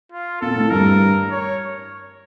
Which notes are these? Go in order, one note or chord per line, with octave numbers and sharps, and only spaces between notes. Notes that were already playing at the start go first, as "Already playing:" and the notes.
F4
A#2 A4
A2
G2 A#4
C#5